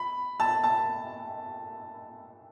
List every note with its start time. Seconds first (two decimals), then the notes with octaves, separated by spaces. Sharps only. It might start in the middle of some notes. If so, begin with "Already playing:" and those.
Already playing: B5
0.40 A5
0.64 A5